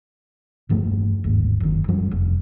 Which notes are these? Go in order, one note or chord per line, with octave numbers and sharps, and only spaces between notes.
E1 G2 F3 A3
G1 D#2 G#2
F#1 D#3
F#2 F3 G3
F1 F2